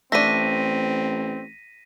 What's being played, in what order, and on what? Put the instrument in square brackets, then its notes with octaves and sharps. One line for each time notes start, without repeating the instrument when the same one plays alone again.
[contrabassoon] A1 [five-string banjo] A3 D4 [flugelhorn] C4 [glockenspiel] A#6 B6 D#7